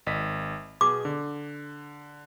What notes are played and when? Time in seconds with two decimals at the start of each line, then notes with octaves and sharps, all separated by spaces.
0.06 G#1 D#5 B6
0.81 B2 G#4 D6
1.05 D3